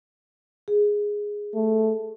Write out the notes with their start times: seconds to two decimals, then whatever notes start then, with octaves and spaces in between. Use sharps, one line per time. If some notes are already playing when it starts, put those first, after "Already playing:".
0.68 G#4
1.55 A3